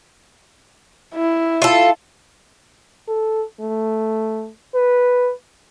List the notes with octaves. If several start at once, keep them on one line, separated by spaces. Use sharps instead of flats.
E4
F4 A4
A4
A3
B4